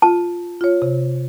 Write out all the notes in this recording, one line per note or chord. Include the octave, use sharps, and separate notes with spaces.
F4 A5
F4 C#5
C3